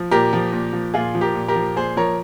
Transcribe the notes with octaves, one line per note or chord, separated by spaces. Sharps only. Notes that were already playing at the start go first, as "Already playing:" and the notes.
Already playing: F3
A#2 G4 A#4
F3
A#2
F3
A#2 F4 G#4
F3
G4 A#4
A#2
G4 A#4
F3
A#2 G#4 C5
F3 A#4 C#5